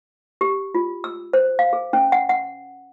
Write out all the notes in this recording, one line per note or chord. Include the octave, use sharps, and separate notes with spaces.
G4
F4
E6
C5
F5
G#4
C#4
F#5
F#5